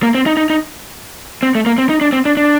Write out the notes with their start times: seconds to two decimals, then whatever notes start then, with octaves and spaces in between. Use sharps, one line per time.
0.03 A#3
0.15 C4
0.26 D#4
0.37 D#4
0.50 D#4
1.43 C4
1.55 A3
1.66 A#3
1.78 C4
1.89 D#4
2.01 D4
2.13 C4
2.25 D4
2.37 D4